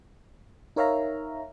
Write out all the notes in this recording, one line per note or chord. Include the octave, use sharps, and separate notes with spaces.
D#4 A#4 C#5 E5 F5 A#5